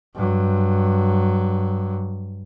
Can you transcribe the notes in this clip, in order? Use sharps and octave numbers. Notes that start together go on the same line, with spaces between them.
G2 F#3